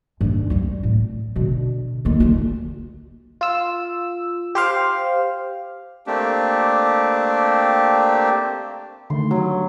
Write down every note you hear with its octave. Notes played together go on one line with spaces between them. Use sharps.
G2 D#3
G3 C4
A2
B2 D3
D#2 D3
D2 F4
F4 E6
G4 C5 F5
A3 A#3 C4 D4 G4
D3 D#3 A3 C6
G2 F#3 F#4